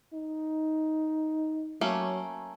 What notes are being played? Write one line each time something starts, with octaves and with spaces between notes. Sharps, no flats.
D#4
F#3 A3 A#3 C#4